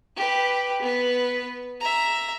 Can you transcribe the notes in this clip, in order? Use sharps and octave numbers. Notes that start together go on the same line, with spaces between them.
G4 B4
B3 B4
E5 A#5